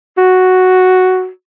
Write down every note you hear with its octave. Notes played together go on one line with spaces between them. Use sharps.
F#4